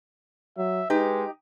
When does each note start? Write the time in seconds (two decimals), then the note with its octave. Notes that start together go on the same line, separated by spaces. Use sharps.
0.57 F#3 E5
0.90 G#3 D#4 G4 B4